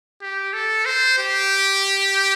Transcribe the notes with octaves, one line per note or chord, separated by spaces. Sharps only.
G4
A4
C5
G4